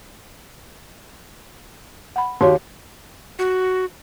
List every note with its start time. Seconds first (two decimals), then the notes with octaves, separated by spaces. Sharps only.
2.16 F#5 B5
2.41 D#2 F#4 G4 C#5 C6
3.39 F#4